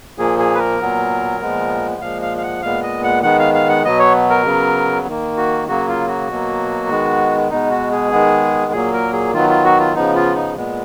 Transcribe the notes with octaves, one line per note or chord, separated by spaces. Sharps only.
A#2 F3 A#3 G#4
G#4
B4
A#4
A#2 F#3 B3
A#2 F3 G#3 B3
A#2 F3 G#3 F5
F5
F5
F#5
A#2 G#3 B3 F5
D#5
F#5
D#3 G#3 B3 F#5
F5
F5
F#5
B2 F#3 B3 D#5
C#5
A#4
C#3 F#3 B3
D#3 A#3
F#4
C#3 F#3 A#3 F#4
F4
F#4
B2 F#3 A#3
D#3 G#3 B3
B2 G#3 B3 D#4
F#4
G#4
D#3 G#3 B3
A#2 F#3 A#3 G#4
A#4
G#4
D#3 F#3 B3 F4
F4
F#4
F4
C#3 F3 B3 D#4
F4
D#4
A#2 G#3 B3